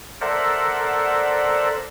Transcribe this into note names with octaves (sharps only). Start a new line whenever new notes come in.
A4 A#4 C5 D5 E5 F#5